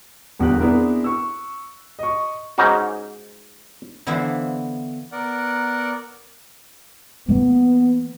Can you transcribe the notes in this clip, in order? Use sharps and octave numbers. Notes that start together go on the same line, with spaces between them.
D#1 E2 D3 A#3 G4 F#6
B3 C4 D4 E4 G#4 A#4
C#6 E6
D#5 C#6
G#2 C#4 D#4 F#4
D3 E3 B3 E4 F4 C5
B3 A#4 D5 F#5
E3 A#3 B3